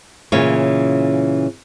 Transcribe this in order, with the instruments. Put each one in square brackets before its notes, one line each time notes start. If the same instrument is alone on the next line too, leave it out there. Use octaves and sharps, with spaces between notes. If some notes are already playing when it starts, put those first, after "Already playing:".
[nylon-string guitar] A#2 C#3 E3 C#4 C#5